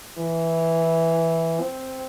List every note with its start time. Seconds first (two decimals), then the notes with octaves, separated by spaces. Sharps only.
0.18 E3
1.61 C4